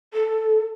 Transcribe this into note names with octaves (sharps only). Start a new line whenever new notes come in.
A4